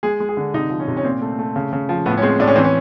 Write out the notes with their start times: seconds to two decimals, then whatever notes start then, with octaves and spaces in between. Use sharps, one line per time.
0.03 G#3 G#4
0.20 G#3
0.29 G#4
0.37 D3
0.54 C3 D#4
0.70 F3
0.80 C#4
0.88 C3
0.97 C#4
1.04 A#2 C4
1.22 A3
1.39 A3
1.56 C#3
1.73 C#3
1.89 F3
2.06 A2 B3
2.17 C#4
2.22 G#3 C4
2.39 A2 D4
2.47 C#4
2.56 E3 C4
2.64 C#4